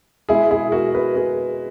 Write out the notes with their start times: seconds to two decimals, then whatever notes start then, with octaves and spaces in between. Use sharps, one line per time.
0.29 B2 G#3 E4 G#4
0.51 E4 G#4
0.72 F#4 A#4
0.94 G#4 B4
1.16 G#4 B4